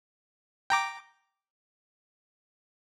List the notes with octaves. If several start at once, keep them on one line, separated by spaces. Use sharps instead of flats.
G5 A#5 D6